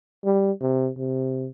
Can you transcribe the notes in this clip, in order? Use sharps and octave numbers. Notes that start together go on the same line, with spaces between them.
G3
C3
C3